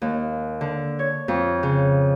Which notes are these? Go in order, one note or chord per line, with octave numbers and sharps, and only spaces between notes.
D#2
D3
C#5
F2
C#3